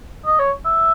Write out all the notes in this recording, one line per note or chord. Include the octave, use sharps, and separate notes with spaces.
D#5
C#5
E5